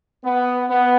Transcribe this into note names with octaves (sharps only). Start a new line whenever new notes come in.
B3
B3